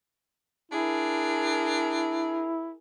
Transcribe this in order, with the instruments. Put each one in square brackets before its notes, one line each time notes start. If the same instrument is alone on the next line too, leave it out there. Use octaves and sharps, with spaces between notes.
[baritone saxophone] D4 [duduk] E4 [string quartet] G#4 A#4